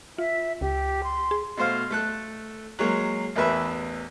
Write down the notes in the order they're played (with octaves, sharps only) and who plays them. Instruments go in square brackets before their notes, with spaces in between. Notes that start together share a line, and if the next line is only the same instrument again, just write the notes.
[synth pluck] F4 [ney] E5
[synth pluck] C#2 [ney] G4
[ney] C6
[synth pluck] G#4
[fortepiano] B2 A3 C5 F5 F6
A3 A4 F#6
F#3 G#3 A#3
A1 E2 A#4 B4 E5 B5